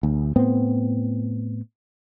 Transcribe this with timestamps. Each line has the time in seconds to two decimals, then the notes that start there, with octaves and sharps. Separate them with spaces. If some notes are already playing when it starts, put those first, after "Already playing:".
0.03 D2
0.36 A2 B3 C4